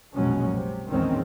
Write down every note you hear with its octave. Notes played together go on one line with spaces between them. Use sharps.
F1 A#1 B2 F#3 G#3 C#4
C3
A#1 E2 D#3 G#3 C4 C#4